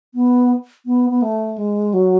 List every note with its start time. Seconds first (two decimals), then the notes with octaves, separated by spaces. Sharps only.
0.14 B3
0.86 B3
1.10 B3
1.22 A3
1.58 G#3
1.94 F#3